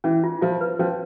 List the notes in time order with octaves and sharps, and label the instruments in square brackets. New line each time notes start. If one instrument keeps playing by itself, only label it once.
[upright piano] E3 [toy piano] C#4
[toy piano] F4
[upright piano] F3 [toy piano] F4
[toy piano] B4
[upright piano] F3 [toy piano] C#4